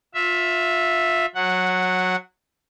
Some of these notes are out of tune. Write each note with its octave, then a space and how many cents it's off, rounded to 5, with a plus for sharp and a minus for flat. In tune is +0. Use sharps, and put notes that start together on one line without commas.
F4 +25 E5 +0
F#3 -15 F#5 +0